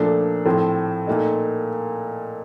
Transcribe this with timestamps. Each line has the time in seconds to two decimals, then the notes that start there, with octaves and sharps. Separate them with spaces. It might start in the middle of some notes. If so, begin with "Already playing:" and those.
Already playing: A#2 F3 A3 D4 A4
0.46 A2 F3 A3 C4
1.07 A#2 A3 D#4